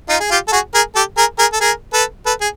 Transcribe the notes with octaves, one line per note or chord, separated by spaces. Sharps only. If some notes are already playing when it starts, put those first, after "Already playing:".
D#4 F4
G#4
F4 G4
A4
F#4 G#4
G#4 A#4
G4 A4
G#4 A#4
G#4 A#4
A4
G#4 A#4
A4 B4
A4 B4
G#4